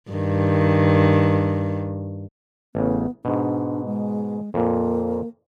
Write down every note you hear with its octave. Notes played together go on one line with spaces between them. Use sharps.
G2 D#3
A1 C#3 B3
G#2 B2 D4
G#3
F2 A#2 A#3